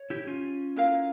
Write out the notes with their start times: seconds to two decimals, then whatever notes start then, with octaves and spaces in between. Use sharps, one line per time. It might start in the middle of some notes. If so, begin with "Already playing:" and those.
Already playing: C#5
0.10 E4 G4
0.27 C#4 F4
0.76 E4 A#4 F5